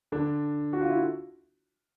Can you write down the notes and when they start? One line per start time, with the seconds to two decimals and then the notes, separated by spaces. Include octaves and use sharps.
0.12 D3 D4
0.73 F#4
0.81 F4
0.90 E4